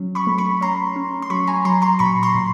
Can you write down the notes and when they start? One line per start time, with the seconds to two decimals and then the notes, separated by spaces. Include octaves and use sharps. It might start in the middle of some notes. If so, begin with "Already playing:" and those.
Already playing: F#3 C#4
0.15 B5 C#6
0.27 A3
0.38 B5 C#6
0.61 C#4 A#5 C6
0.96 C#4
1.22 C6
1.30 F#3 B5 C#6
1.47 G#5 A#5
1.65 F#3 A#5 C6
1.82 A#5 C6
1.99 A#2 B5 C#6
2.23 A#5 C6
2.35 A#2